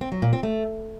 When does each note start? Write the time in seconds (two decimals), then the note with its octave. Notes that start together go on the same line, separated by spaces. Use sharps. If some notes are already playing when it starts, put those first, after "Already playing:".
0.01 C4
0.12 F#3
0.22 A#2
0.33 C4
0.43 A3